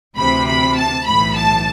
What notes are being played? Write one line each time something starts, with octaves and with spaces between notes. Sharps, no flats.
D2 C3 E3 B5
B5
A5
B1 A2 E3 B5
A5